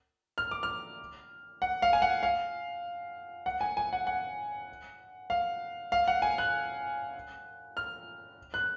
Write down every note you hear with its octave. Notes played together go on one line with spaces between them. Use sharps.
F6
D6
F6
F#5
F5
G#5
F#5
F5
F#5
G#5
G#5
F#5
F#5
F5
F5
F#5
G#5
F#6
F6
F#6